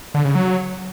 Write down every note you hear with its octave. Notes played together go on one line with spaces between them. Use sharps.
D3
C#3
F#3